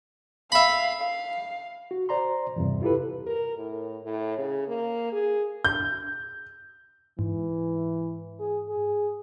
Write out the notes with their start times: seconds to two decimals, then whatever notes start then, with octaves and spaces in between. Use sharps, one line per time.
0.52 E5 F5 B5
1.03 F5
1.91 F#4
2.09 C5 D5 A#5 C6
2.56 E2 G2 C3
2.82 E4 F4 G4 A4 B4
3.27 A#4
3.57 A2
4.03 A2
4.38 C#3
4.67 A#3
5.12 G#4
5.65 G6
7.19 G#2 E3
8.40 G#4
8.69 G#4